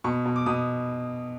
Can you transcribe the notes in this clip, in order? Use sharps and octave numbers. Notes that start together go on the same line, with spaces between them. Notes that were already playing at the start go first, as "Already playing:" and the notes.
B2 C#6
B2
D6
B2 D#6